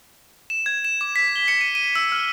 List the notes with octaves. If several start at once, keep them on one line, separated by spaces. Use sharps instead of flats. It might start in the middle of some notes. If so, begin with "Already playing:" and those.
E7
G#6
E7
D6
B6
G7
C#7
D#7
D#7
E6
F6